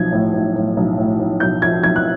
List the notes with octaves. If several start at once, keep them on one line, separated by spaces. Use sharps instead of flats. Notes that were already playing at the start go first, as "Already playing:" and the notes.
Already playing: B1 F3 G#6
A2
A2
A2
B1
A2
A2
B1 G6
F3 G#6
B1 G#6
F#6